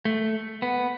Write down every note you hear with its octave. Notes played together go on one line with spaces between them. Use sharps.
A3
B3